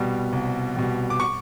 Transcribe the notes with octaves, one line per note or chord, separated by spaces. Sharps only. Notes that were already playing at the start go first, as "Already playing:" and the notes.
Already playing: C2 B2 G3
C2
B2 G3
D6
C#6